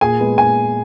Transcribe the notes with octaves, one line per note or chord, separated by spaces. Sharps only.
A#2 G#4 G#5
G#3 B3
A#2 G#5